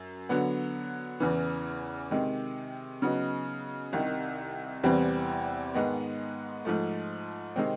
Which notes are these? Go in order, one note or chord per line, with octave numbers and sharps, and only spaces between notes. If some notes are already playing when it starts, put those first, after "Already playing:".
Already playing: F#2
D3 F#3 B3
E2 C#3 E3
C3 D#3 G#3
C#3 F#3 B3 D#4
C2 C3 D#3
E2 C3 E3 G3 C4
G#2 D#3 G#3 B3
G#2 F3 A3
C3 D#3 G#3 C4